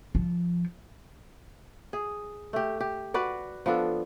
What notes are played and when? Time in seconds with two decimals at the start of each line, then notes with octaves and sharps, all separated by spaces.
0.15 F3
1.93 G#4
2.53 A3 G4
2.80 G4
3.14 F#4 B4 D5 F#5
3.66 F3 B3 D4 A4